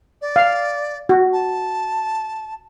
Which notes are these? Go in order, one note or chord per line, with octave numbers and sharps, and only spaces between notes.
D5
F5
F#4
A5